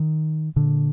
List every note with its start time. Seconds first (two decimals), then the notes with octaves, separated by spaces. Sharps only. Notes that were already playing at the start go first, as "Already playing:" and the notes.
Already playing: D#3
0.56 A#2 D3